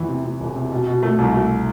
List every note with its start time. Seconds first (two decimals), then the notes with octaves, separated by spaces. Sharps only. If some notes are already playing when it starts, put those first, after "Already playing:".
Already playing: E2 E3
0.09 C3
0.24 C3
0.40 E1
0.56 C3
0.71 B2
0.87 B2
1.03 A3
1.18 C2
1.34 A3